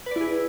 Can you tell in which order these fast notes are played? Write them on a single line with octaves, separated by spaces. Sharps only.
B4 D5 E4 G#4